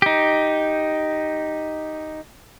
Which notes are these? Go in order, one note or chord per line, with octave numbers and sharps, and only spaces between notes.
D#4 G4